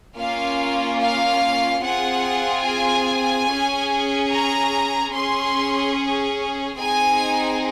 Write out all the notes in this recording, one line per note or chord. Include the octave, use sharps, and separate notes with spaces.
A#3 C#4 F4 F5
F5
C4 F4 G#4 F#5
G#5
C#4 G#4
A#5
C#4 G#4 C6
C4 D#4 G#4 G#5